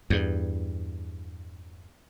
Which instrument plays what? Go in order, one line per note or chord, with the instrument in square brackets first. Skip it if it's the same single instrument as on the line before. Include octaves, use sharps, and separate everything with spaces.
[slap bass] E2 G2